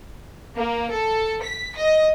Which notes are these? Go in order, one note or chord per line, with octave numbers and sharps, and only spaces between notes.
A#3
A4
B6
D#5